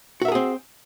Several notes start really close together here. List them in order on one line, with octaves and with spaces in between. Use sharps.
F#4 E5 A#4 G#4 C4